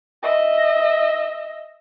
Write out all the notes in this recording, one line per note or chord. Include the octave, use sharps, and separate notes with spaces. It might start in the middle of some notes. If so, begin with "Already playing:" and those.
D#5 E5